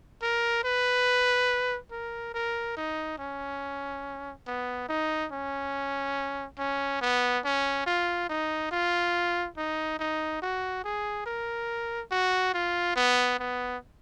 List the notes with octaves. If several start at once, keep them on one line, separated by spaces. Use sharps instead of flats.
A#4
B4
A#4
A#4
D#4
C#4
B3
D#4
C#4
C#4
B3
C#4
F4
D#4
F4
D#4
D#4
F#4
G#4
A#4
F#4
F4
B3
B3